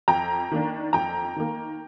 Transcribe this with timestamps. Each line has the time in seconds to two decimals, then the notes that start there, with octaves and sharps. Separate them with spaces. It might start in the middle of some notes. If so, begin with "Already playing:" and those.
0.08 F2 G5 A#5
0.52 D#3 A#3 D4
0.93 F2 G5 A#5
1.36 D#3 A#3